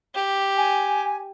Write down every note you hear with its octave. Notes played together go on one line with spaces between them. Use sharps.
G4
G#5